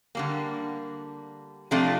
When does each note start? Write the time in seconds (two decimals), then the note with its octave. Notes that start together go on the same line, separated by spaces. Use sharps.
0.15 D3 G3 A#3
1.71 C3 F3 A3 D4 F4